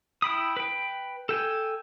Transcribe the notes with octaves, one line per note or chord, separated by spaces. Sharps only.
E4 G5 B5 D#6
B4 G5
A4 G5 G#5